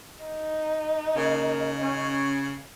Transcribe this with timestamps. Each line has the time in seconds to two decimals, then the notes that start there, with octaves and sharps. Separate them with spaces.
0.24 D#4
1.16 C#3 A#3
1.82 C#4